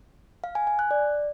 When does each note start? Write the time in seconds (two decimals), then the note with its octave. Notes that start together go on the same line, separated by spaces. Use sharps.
0.44 F5
0.55 G#5
0.67 G#5
0.79 F#6
0.91 D5